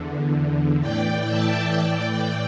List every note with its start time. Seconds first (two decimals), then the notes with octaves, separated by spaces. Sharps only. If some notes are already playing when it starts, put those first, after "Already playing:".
Already playing: E2 D3
0.80 A2 E3 D5 G5
1.28 E5 A5
1.75 A2 E3 D5 G5